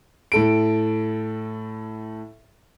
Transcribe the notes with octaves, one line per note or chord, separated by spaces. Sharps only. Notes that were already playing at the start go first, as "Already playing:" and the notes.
A2 A4 D7